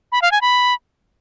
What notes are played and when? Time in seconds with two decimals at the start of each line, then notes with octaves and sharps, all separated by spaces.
0.12 B5
0.22 F5
0.32 G#5
0.41 B5